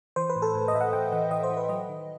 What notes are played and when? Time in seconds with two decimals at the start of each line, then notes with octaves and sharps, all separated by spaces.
0.16 E3 C5
0.30 B4
0.36 A2
0.42 A4
0.55 A2
0.68 D#5
0.73 A2 E5
0.81 F#5
0.93 A2 G5
1.12 E3 F#5
1.31 E3 D#5
1.43 C5
1.50 E3
1.57 B4
1.69 F#3 D#5
1.89 D#3